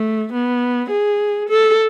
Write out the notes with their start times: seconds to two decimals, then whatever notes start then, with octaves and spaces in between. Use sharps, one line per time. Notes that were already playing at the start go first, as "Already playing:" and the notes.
Already playing: A3
0.33 B3
0.90 G#4
1.49 A4